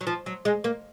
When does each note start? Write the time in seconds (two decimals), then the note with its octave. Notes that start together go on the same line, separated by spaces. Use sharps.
0.01 F#3
0.07 F3
0.26 F#3
0.45 G#3
0.64 A#3